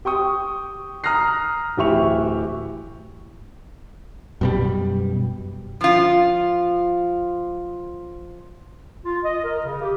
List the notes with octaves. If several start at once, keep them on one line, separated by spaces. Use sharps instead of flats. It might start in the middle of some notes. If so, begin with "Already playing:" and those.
G4 G5 C#6 D#6
A#5 D#6 F6 F#6 A#6 C7
D1 E3 G4 E5 C#6 F7
F#2 B2 G3
F3 F4
F4
D#5
A#4
C#3
G4